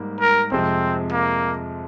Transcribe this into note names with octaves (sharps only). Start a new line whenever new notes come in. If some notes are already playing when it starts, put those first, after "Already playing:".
Already playing: G#2 G3 A#3
A#4
F2 C3 F3 G#3 C4
A#3